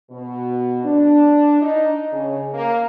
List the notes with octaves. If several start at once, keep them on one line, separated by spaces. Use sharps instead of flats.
B2
D4
D#4
C#3
A#3